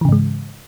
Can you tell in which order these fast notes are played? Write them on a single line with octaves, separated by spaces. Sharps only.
E3 C#3 G#2 G#3